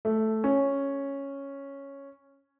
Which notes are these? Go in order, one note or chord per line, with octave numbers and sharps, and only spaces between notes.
A3
C#4